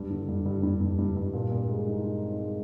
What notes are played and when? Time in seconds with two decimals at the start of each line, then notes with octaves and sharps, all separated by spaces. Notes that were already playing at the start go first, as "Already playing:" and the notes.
Already playing: G2
0.10 D3
0.28 G2
0.46 G2
0.63 G2
0.81 G2
0.98 G2
1.16 G2
1.34 A#2
1.51 A#2
1.69 G#3
1.87 D#4
2.04 D#4
2.21 C4
2.39 G#3